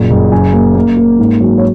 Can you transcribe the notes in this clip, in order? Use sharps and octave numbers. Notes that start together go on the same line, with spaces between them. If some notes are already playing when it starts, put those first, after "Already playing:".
Already playing: F#1 A#2
F#1
F#1 G#5
A#3
A#3
A#3
G#2
F#3
C#5